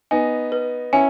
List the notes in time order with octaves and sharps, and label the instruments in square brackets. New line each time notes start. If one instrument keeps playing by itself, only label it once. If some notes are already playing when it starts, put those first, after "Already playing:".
[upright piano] B3 D#4 [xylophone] G#5
[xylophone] B4
[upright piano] C#4 E4 [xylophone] G#5